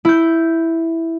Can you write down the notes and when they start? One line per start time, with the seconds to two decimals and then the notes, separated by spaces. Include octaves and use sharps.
0.05 E4 G6